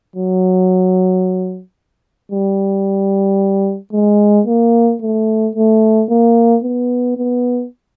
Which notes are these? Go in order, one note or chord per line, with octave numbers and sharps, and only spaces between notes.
F#3
G3
G#3
A#3
A3
A3
A#3
B3
B3